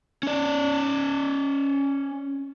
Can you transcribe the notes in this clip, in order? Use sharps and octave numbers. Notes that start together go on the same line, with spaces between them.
C#4 D5